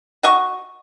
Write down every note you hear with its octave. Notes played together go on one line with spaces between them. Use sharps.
F#4 D#5 C#6